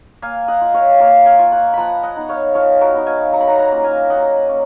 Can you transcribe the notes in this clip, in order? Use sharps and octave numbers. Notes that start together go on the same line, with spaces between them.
A#3 F5 G#5
D#5 F#5
F4
C#5 F5
A#3 C#5 F5
F5 G#5
F4
F#5 A#5
F3 F#5 A#5 B5
D#5 F#5
B3 D#4
C#5 F5
F3 C#5 F5
F#4 A#4
B3 D#4
F5 G#5
F#3 A#5
B5
F#5 A#5
F#5 A#5
A#3 C#4 F4
F5 G#5
F#3 D#5 F#5
A#3 C#4